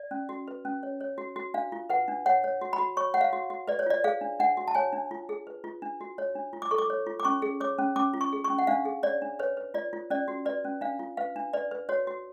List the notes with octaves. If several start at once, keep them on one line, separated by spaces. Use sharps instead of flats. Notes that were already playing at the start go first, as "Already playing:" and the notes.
Already playing: D5
C#4
F#4
B4
C#4
C#5
C#5
F#4
F#4
D4 F5
F4
B4 F#5
D4
C#5 F#5
C#5
F#4
B5
F#4
C#5 C#6
C#5 F#5
F5
F#4
F#4
B4 D5
C#5
F4 D5
G#4 F5
D4
D4 F#5
F#4
A5
C#5 G#5
D4
F4
G#4
B4
F4
D4
F#4
C#5
D4
F4
D6
A4 C#6
D6
C#5
F4
D6
C#4 C#6
G#4
C#5 D6
C#4
C#4 D6
F4
C#6
G#4
C#6
C#4
F#5
D4 F5
G#4
C#5 D5
D4
B4 C#5
B4
F4 D5
F4
C#4 D5
F#4
B4 D5
C#4
D4 F5
F4
B4 F5
D4
B4 D5
B4
F#4 C#5
F#4